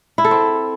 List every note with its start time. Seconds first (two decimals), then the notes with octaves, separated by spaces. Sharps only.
0.18 E4
0.25 A4
0.31 C4